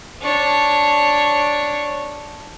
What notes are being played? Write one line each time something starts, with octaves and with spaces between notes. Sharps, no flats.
D4 C#5